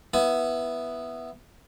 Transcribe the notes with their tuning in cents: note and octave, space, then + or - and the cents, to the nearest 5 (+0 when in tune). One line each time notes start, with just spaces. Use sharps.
B3 +0 E4 +0 G#5 +35